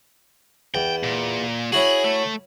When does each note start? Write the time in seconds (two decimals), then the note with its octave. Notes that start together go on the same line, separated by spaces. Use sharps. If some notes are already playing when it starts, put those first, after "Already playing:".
0.75 E2 G5
1.03 A#2
1.72 C#4 E4 F#4 G#4
2.04 A3